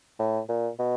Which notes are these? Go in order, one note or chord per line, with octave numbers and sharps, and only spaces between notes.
A2
A#2
B2